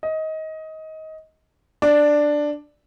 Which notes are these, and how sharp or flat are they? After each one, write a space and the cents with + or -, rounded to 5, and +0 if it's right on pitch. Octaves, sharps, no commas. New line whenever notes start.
D#5 +20
D4 +5